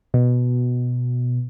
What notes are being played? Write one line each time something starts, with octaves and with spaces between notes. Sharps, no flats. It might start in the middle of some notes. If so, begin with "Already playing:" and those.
B2